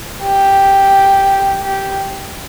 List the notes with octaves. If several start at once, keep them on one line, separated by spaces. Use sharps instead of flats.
G4
G4